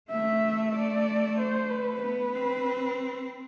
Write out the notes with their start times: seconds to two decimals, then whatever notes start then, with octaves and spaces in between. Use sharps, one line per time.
0.11 A3 E5
0.75 D5
1.38 C5
1.70 B4
2.02 B3 B4
2.35 C4